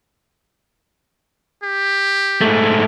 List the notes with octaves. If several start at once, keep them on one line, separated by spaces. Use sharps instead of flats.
G4
G#2 A3